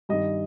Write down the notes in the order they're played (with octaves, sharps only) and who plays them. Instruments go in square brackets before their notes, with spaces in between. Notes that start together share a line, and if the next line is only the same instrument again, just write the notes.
[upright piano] G2 D#3 D#5